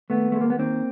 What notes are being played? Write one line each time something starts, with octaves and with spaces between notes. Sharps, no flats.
D#2 A3 B3
G#3 A3
A#3
B3
D#3 A#3 C4